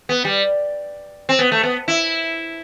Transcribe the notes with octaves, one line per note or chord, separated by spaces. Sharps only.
B3
G3
C4
B3
A3
B3
E4